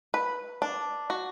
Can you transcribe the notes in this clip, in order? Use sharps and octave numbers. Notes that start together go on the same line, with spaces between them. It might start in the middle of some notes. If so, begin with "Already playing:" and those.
B4
D4
F#4